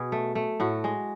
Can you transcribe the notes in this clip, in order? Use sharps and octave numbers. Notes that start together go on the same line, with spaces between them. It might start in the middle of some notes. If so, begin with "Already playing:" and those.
Already playing: B2 G#4
A3
A3
A2 F#4
G#3